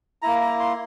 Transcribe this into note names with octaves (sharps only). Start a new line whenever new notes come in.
A#3 E4 A#5
A#5
C6